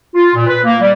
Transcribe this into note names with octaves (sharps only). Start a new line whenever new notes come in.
F4
A#2
B4
A#3
G3